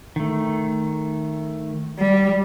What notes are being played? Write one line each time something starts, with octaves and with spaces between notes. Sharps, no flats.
D#3 A3
G3